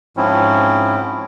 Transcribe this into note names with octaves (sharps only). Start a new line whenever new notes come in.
G#2 F3 C4 C#4 E4